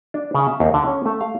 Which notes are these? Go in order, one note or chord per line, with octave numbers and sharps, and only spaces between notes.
D4
C#3
E5
D#2
D3
C#4
A3
F5